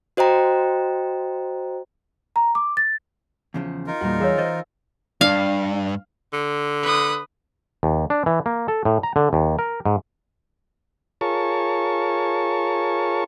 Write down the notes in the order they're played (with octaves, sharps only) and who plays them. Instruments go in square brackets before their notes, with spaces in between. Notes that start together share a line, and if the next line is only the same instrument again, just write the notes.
[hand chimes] F#4 C5 D#5 G5 A#5
[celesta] A#5
D6
A6
[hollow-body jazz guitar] E2 C#3 F3
[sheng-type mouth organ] D#4 F4 A#4
[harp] E2 G3 [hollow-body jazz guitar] A#2 F#4
[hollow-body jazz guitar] E3 [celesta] G#4 C#5 [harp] F5 G#5 E6
[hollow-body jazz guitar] E3 C5 D#5 [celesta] A6
[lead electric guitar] G2 [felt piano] D4 [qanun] F5
[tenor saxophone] D3
[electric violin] B4 D#6
[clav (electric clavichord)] D#2
D4
E3
A#3
A4
A2
A#5
D3
D#2
A#4
G#2
[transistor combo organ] F4 G#4 A#4 C#5 A5 C#6